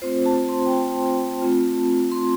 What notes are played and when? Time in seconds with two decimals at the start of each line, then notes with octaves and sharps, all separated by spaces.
0.02 A3 C4 F4 C5
0.26 A5
0.49 C6
0.66 G5
0.72 A5
1.42 A3 C4 F4
2.12 C6